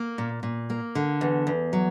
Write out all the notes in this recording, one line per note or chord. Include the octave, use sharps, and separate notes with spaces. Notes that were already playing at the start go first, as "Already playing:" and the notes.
Already playing: A#3
A#2
A#2
A#3
D3
E2
E2
F#3